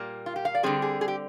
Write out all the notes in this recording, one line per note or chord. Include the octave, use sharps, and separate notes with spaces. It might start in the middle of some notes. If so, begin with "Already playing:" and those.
Already playing: A#2 G3 A#3
F4
G4
F5
D5
D3 G3 C4 G#4
G#4
G#4
G4